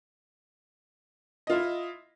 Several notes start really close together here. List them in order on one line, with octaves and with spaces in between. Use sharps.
D#5 F4 E4